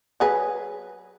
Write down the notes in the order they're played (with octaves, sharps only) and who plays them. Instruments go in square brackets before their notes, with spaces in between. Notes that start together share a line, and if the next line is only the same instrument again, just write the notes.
[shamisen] F#3 G#4 B4